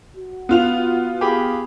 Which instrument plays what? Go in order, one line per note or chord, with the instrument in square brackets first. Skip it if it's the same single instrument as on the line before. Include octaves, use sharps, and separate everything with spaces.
[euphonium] F#4
[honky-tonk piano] B3 F4 F7
[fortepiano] G4 G#4 B5